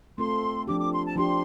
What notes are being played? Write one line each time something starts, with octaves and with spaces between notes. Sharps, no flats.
A3 C4 F4 A4 C6
F3 D4 G4 D6
D6
C6
A5
F3 D4 G4 C6